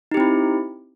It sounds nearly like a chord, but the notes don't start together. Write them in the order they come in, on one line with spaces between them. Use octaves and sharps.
D#4 G4 C4 E4